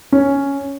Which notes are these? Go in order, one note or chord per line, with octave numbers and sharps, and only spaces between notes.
C#4